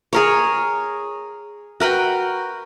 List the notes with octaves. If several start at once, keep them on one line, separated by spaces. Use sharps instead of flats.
G#4 A#4 C#5
F#4 A#4 B4 G5